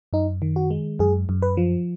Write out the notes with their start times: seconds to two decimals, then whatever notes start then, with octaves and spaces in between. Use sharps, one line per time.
0.13 F#2 D#4
0.42 D#3
0.56 F#4
0.70 G#3
0.99 F#2 G#4
1.29 F#2
1.42 B4
1.57 F3